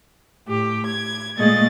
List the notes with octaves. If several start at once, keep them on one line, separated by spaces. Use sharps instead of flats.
A2 G4
G#6
A#2 G#3 A3 G#4 D#5 A6